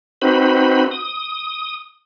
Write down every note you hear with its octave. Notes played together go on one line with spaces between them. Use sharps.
C4 D#4 F#4 B4 C5 B5
D#6